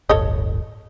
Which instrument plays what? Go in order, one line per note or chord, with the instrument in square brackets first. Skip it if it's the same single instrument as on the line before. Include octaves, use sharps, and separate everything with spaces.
[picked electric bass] D1 G1 [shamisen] A4 C#5 D#5